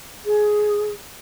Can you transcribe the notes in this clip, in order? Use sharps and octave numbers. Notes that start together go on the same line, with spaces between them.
G#4